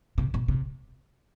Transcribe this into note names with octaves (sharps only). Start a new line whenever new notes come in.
C3
B2
C3